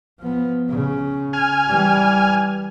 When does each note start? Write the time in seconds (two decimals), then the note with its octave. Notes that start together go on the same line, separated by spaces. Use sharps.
0.20 F3 B3
0.69 C#3
1.33 G#5 F6
1.67 E3 G3